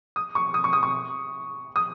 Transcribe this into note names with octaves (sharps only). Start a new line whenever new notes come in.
D#6
C#6
D#6
C#6
D#6
C#6
D#6